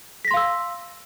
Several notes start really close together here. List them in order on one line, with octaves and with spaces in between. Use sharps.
B6 A#6 C6 F5 E6